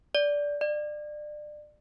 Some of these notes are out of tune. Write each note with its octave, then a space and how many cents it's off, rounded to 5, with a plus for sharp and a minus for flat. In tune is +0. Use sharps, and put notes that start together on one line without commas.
D5 -10
D5 +25